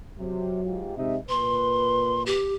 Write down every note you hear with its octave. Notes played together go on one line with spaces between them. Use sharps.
C3 F#3
G#2 F4 G4
C3 G#3 D#4 E5
A#2 B4 C6
G4